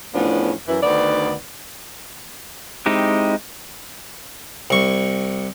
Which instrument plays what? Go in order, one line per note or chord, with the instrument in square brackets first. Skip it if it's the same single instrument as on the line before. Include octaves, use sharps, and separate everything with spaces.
[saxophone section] E2 A2 F3 B3 C#4 D4
F#2 E3
D2 D#3 B3 D4 D5
[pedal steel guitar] G#3 C4 D#4 E4 G4
[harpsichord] C2 C#6